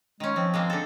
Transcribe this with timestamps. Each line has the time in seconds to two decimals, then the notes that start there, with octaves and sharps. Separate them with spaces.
0.20 D#3 G#3 C#4
0.36 F3 C4
0.54 G#3 A#3 C4
0.70 D3 A4